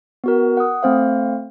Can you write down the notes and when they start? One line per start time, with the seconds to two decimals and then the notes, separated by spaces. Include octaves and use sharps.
0.24 B3 F#4 A#4
0.57 F#5 D#6
0.83 A3 C4 C5 F5